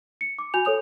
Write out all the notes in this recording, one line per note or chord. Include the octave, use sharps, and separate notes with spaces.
C#7
D6
F#4 G#5 G6 F7
A4 C#5 D#6 F7